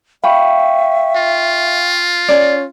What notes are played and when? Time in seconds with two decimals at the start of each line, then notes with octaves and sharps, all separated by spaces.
0.24 E5 F5 G5 B5 C#6
1.16 F4
2.28 C#4 G#4 D5